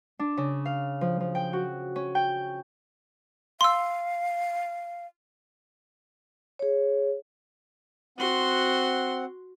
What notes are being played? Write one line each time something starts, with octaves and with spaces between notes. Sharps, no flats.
D4
C#3
F5
F3
F3
G5
F#4
C#4
G5
F5 C6 E6
G#4 C#5
C4 F#4 F#5 C6